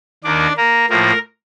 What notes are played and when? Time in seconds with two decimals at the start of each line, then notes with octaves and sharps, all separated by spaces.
0.24 D#2 D#3 A#3 D4 D5
0.57 A#3 A#4
0.89 A2 F3 A#3 A#4